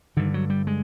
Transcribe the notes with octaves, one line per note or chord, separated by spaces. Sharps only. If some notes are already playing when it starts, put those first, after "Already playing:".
G2 D3 D#3
F#3
G3
G#3